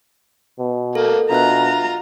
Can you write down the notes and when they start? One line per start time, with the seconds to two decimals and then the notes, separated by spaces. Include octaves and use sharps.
0.59 B2
0.95 A3 A#3 A4
1.31 B2 D4 F4 E5 A#5 F#6